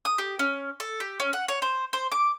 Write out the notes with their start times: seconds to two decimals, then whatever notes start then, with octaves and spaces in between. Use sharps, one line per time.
0.05 D#6
0.18 G4
0.39 C#4
0.80 A4
1.00 G4
1.20 C#4
1.33 F#5
1.48 C#5
1.62 C5
1.93 C5
2.12 D6